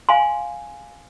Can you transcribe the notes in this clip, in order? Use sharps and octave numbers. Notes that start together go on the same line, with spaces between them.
F5 G#5 C6